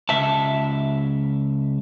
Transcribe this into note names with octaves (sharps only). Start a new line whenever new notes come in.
C#2 E5 A5